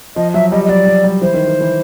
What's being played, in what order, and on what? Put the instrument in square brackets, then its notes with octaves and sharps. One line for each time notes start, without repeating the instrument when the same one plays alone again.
[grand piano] F3 [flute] D#5
[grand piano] F#3 [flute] E5
[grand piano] G3 [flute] D#5
[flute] D#5
[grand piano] F#3 [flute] D5
[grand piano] F#3
G3
[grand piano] E3 [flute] C5
[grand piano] D#3
D#3
E3